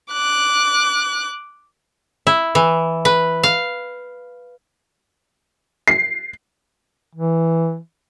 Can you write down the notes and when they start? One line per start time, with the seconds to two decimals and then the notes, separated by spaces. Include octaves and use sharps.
0.12 D6 F#6
2.27 E4
2.55 E3
3.05 B4
3.43 F5
5.88 C7
7.15 E3